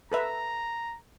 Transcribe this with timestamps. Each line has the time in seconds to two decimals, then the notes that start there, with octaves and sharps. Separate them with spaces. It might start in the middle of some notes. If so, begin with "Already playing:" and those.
0.12 A4 B4 E5 A#5